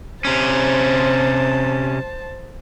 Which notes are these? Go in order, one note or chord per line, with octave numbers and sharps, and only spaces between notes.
C3 C#4 C5 A5